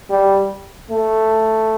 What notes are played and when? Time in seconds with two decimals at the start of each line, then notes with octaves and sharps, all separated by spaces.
0.10 G3
0.91 A3